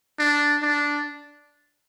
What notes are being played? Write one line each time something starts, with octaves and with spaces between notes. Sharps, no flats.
D4
D4